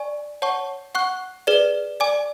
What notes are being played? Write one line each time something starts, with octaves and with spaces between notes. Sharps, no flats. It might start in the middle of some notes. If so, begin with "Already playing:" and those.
Already playing: D5 G#5 C#6
C#5 F#5 A5 C#6
F#5 C#6 F#6
G#4 B4 D5
D5 G#5 D6